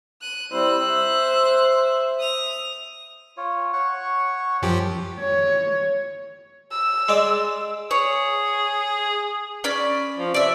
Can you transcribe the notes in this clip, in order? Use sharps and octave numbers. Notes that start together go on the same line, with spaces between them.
F#6 D#7
G3 C4 E4 C5 E6 F#6
E5
D#6 F7
F4 C#5
C#5 F#5 C#6
F#2 F3 G4
C#5
E6
G#3 D5
G#4 C#5
C#4 D5 B5
F3
C3 D5 E5